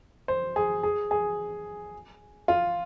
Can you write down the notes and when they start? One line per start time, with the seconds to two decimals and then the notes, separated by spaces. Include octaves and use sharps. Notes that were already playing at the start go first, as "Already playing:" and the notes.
0.28 C5
0.56 G#4
0.83 G#4
1.11 G#4
2.48 F4